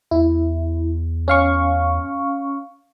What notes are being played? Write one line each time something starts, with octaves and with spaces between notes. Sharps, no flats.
E2 E4
C#4 F5 C#6